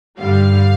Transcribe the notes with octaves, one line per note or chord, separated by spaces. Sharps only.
G2 D3 G3 F5